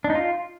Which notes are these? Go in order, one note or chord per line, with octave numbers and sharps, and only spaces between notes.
D4
D#4
F4